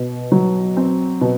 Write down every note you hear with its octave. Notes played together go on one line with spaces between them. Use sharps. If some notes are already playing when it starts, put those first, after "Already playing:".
Already playing: B2
F#3
C4
B2